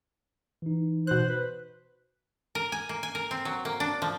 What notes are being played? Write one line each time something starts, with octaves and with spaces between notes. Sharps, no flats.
E3 D#4
B2 C5 F#6
B4
A#4
G#5
A#3
G#5
A#4
C4
F#3
A#3
D4
F3